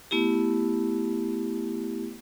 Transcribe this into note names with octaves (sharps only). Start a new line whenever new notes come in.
A3 B3 E4 G4